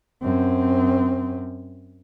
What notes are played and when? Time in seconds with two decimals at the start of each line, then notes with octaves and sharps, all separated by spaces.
0.22 F#2 C4